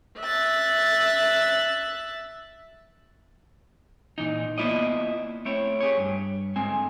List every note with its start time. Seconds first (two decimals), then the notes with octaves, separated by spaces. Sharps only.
0.18 E5 F#6 A6
4.18 A#2 E3 D#4
4.58 A#3 B3 E4 F4 D5 D#5
5.45 A3 C4 E4 C#5
5.80 G4 G#4 C#5
5.98 G2
6.56 G#2 D3 G#3 C4 G#5